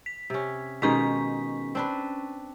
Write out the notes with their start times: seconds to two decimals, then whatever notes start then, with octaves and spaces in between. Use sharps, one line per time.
0.06 B6
0.30 C3 C#4
0.82 B2 D#3 G#3 C#4 C#6 B6
1.75 C4 D4 B4